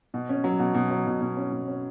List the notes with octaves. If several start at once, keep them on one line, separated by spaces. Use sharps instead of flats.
B2
C#4
F#3
B2
B2
F#3
B2
B2
C#4
B2
C#4